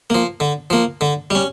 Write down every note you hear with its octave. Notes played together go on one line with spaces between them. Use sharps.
F3 A#3
D3
F3 A#3
D3
G3 C#4